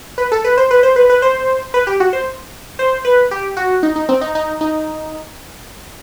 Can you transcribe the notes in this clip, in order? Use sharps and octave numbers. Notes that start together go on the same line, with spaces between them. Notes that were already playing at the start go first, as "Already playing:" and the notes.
B4
A4
B4
C5
B4
C5
B4
B4
C5
B4
G4
F#4
C5
C5
B4
G4
F#4
D#4
D#4
C4
D#4
D#4
D#4